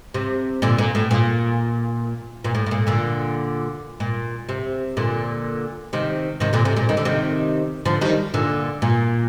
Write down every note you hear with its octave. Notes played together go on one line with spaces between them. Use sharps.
C3
A#2 D3
A#2
A2
A#2
A#2
A2
A2
A#2
A#2 D3
A#2
C3
A#2 D3
C3 D#3
C3 D#3
A#2 D3
C3
A#2
D#3
D3
C3 D#3
D3 F3
D#3 G3
A#2 D3
A#2